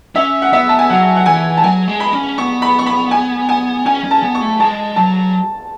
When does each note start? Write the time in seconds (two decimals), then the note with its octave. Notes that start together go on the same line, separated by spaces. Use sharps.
0.15 C#4 E5
0.42 F#5
0.52 B3 E5
0.69 A5
0.79 G#5
0.90 F#3 F#5
1.16 F#5
1.26 E3 G#5
1.57 A5
1.64 F#3 G#5
1.88 G#3
2.00 B5
2.13 C#4
2.38 B3 C#6
2.62 B5
2.79 C#6
2.86 B5
3.11 G#5
3.49 G#5
3.85 C#4 G#5
4.04 C#4
4.11 A5
4.23 B3
4.35 C#6
4.41 A3
4.60 G#3 A5
4.96 F#3 A5